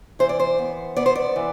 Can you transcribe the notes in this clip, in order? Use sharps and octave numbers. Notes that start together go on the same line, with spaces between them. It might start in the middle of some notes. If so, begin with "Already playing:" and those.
E3 C5
D5
C5
B3
B3 D5
C5
D5
E3